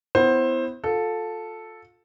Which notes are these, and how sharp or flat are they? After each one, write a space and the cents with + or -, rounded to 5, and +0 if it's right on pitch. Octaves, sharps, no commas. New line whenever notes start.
B3 +25 E4 +0 C5 +20
F4 +30 A4 +0